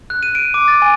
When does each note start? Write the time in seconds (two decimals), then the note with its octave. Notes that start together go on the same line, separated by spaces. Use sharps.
0.10 F#6
0.23 D#7
0.35 D7
0.54 D6
0.68 A6
0.82 G#5